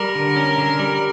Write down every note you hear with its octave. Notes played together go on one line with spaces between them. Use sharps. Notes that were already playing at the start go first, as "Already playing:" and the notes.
Already playing: G3 A#4
D3
C#4
D3
G3